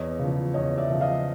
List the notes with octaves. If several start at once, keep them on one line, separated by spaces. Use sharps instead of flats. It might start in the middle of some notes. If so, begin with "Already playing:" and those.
Already playing: E2 C#5 D#5
C#3 F3
E2 C#5 D#5
D5 E5
C#3 F3
D#5 F5